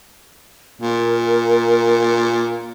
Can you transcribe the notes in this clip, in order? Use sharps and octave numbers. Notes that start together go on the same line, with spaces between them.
A#2 A#4